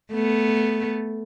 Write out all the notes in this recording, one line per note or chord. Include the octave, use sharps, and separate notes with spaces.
A3 B3